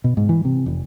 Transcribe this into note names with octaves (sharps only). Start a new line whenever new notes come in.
B2
G#2
E3
C3
F1